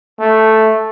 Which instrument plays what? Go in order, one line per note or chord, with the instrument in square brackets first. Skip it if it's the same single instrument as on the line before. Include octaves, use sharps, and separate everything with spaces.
[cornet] A3